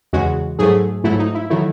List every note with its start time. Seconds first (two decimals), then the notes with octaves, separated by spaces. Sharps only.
0.13 E2 C#3 G#3 F#4
0.59 G#2 F#3 A3 G#4
1.04 G#2 F#3 A3 E4
1.19 D#4
1.34 E4
1.50 D#3 F#3 A3 E4